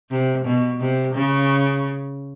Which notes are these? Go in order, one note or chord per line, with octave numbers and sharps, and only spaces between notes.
C3
B2
C3
C#3